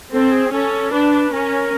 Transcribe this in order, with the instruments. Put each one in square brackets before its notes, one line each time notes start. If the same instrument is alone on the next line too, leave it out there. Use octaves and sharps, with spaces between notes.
[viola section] C4 [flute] A4
[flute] G#4
[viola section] C#4 [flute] A4
[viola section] D4 [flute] B4
[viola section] C#4 [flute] A#4